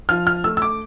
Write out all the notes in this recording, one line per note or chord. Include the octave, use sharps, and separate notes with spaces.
F3 F6
F6
A3 E6
E6
D6